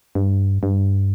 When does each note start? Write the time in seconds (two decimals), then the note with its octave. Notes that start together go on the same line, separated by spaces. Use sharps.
0.15 G2
0.63 G2